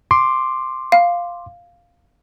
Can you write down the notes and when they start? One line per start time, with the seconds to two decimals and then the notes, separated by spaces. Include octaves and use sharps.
0.11 C6 D6
0.92 F5